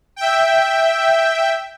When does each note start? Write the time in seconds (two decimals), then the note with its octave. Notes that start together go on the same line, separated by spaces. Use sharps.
0.16 E5 G5